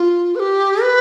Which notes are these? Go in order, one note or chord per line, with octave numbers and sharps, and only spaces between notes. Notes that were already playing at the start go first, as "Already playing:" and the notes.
Already playing: F4
B4
G4
B4